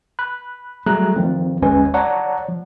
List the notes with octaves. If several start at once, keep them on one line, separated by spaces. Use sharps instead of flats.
B5 F#6
F#3 G3 A3 G#4 A#5 F#6
D#3 F3 C4
G1 D#2 G#3 C#4 B4 G#5
C#5 D5 F#5 A5 A#5
F3